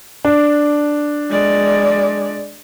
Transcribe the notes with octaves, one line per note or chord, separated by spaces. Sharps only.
D4
G#3 D5